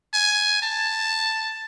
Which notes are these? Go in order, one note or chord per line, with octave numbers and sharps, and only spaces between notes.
G#5
A5